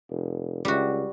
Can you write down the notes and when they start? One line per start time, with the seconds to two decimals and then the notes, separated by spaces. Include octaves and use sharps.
0.10 F1
0.65 C#2 G3 F#4